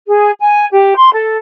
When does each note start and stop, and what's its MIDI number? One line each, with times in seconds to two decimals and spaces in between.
0.07 0.30 68
0.40 0.66 80
0.71 0.95 67
0.95 1.10 84
1.13 1.37 69